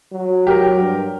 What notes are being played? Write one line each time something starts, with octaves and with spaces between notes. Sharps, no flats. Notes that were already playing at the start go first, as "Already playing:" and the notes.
F#3
G4 A#4
G2